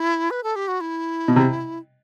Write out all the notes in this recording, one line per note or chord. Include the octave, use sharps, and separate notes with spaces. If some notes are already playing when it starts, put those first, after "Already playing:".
Already playing: E4
B4
A4
G4
F#4
E4
B2
C3